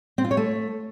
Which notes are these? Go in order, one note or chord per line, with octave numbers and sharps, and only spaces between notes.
C4
F4
C#5
A3